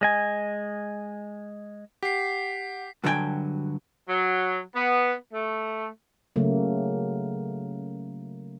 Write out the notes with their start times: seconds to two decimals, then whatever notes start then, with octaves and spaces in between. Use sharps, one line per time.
0.01 G#3 D#5 G#5
2.03 G4 F#5 B6 C7
3.04 G2 D3 F#3 E4 G5 G#5
4.09 F#3
4.76 B3
5.33 A3
6.36 C#3 F#3 A3 A#3